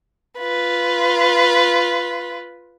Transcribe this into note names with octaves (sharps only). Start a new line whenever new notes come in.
F4 B4